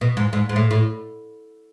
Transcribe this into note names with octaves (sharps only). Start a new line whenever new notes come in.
B2
G#2
G#2
G#2
A2
A2